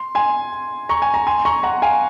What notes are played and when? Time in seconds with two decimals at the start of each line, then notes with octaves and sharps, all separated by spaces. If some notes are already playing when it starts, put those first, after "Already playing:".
Already playing: C6
0.15 G#5 C6
0.89 A#5 C#6
1.02 G#5
1.14 A#5
1.27 G#5 C6
1.45 A#5 C#6
1.63 F#5 A#5
1.82 F5 G#5